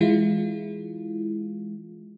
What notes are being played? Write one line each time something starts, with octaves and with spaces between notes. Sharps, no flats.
E3 G#3 E4 F4